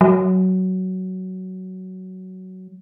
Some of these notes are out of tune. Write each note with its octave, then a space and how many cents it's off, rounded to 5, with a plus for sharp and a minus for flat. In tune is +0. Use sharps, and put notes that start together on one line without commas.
F#3 +10